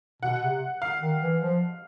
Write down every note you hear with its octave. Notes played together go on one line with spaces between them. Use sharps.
B2 F#5
C3
F5
D#3
E3
F3